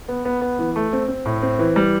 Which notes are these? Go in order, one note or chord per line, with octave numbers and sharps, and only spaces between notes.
B3
B3
B3
E3
A3
C4
C4
A2
C4
E3
G3